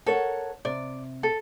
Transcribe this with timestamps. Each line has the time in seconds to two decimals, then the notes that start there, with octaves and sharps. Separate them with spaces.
0.06 A4 A#4 C#5 F#5
0.65 C3 D5
1.23 A4